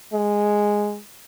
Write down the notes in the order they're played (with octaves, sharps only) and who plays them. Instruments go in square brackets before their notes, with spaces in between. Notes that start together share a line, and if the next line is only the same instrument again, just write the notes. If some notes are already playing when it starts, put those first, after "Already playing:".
[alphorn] G#3